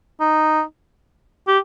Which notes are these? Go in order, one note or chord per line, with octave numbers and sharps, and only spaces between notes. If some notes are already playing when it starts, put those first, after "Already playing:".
D#4
G4